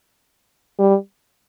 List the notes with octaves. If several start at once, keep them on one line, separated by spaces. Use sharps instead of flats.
G3